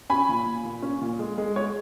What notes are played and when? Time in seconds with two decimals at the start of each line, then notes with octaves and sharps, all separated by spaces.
0.09 C#4 G#5 B5
0.29 A#2
0.46 A#2
0.65 A#2
0.82 C#4
1.01 A#2
1.19 G#3
1.38 G#3
1.56 G#3 C#5